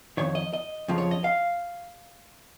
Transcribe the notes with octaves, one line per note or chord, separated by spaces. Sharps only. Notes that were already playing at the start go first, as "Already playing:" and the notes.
F2 C3 D#3 C#5
D#5
D#5
F2 C#3 F3
C#5
D#5
F5